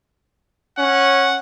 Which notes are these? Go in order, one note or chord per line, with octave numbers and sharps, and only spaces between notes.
C#4 F#5